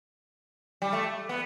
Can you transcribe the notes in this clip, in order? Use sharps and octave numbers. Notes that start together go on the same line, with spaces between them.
G3
A3
B3